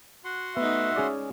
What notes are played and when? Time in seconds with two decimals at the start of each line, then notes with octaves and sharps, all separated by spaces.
0.24 F#4 F#5 C6
0.57 A3 B3 D#4 E5
0.96 G#3 C#4 G#4 D5